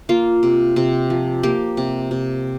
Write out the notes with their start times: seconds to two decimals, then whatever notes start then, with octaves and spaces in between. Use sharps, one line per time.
0.09 A#3 F4
0.43 C3
0.76 C3
1.10 F3
1.43 A#3 G4
1.77 C3
2.11 C3